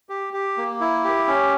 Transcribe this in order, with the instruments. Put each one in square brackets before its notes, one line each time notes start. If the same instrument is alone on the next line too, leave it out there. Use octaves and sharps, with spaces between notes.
[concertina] G4
G4
A#3
E4
G4
C#4